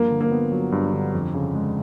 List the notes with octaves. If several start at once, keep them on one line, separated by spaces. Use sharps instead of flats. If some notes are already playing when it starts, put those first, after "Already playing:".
Already playing: G2 F3 A#3
D3
A#3
B3
F#3
G2
D3
F2
C#3
G#3